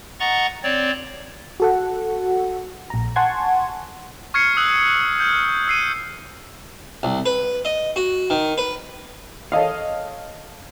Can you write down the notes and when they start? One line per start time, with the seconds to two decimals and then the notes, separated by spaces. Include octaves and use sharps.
0.20 D#5 F#5 A#5 C#6 A6
0.63 C4 C#5 D5
1.60 F#4 A4 F#5
2.90 A#1 A#5
3.16 F#5 G#5 A5 C6 C#6 G#6
4.34 C#6 F6 G#6 C7 C#7
4.57 D#6 E6 F#6 F#7
5.20 F6 G6
5.68 E6 C7 D#7
7.03 C2
7.26 B4
7.65 D#5
7.96 F#4
8.30 D#3
8.58 B4
9.52 A4 C#5 D#5 F5